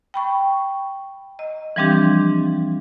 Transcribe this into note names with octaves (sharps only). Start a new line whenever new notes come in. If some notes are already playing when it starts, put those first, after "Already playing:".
G5 B5 C#6
D#5
E3 F3 G3 C4 D4 G4